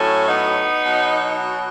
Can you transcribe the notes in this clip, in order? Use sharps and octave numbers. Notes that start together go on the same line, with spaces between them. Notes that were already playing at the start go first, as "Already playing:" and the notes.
Already playing: A2 F#3 A3 C#4
B3 D#4
B2 F#3